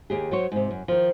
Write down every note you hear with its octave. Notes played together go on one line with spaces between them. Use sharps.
D#2 G4 G#4
F#3 C5 C#5
G#2 C3
F#2
D#3 F3